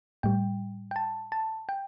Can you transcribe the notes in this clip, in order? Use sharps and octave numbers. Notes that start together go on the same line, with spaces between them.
A2 G3 G5
G5
A5
A5
G5